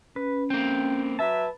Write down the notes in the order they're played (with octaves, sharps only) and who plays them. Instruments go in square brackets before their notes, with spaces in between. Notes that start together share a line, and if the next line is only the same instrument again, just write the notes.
[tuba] C#4 [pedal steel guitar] B4
[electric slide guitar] A#3 C4 [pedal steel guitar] G5
[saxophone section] F#3 E5 [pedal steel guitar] B4 A5